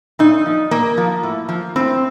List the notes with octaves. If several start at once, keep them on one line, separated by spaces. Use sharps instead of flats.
A#2 D#4
F3
A#2 A#3
F3
A2
F3
A2 C4